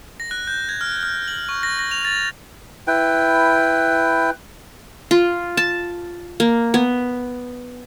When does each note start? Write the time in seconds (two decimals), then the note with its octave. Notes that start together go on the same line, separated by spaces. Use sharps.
0.20 A#6
0.31 F#6
0.47 G6
0.69 G#6
0.81 F6
1.03 F6
1.28 F#7
1.49 C#6
1.63 A#6
1.79 A#6
1.91 F7
2.05 A6
2.87 E4 B4 G5
5.11 F4
5.57 A5
6.40 A#3
6.74 B3